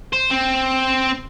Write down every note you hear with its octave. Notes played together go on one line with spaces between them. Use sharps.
C5
C4